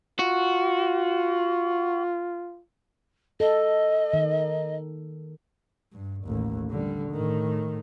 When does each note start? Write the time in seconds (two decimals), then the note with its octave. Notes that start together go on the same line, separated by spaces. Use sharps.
0.19 F4 F#4
3.40 A4 D#5
4.13 D#3
5.93 G2
6.25 A1 D#2
6.70 D3 G3
7.12 A2 D#3